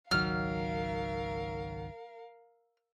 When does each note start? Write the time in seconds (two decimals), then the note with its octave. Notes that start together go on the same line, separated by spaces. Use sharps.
0.11 G#1 C#2 D#3 F#3 A#4 F5 F6